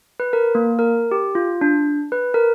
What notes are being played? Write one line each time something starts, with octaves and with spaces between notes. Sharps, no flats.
B4
A#4
A#3
A#4
G4
F4
D4
B4
A#4